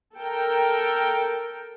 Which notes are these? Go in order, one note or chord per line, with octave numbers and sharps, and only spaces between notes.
A4 A#4 G5